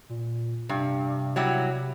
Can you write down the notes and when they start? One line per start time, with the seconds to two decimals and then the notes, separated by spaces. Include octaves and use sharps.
0.09 A#2
0.69 G2 C3
1.36 F#3 G3 E4